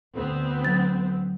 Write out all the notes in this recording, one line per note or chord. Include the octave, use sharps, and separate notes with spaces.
D2 B3 C4
F#3 A6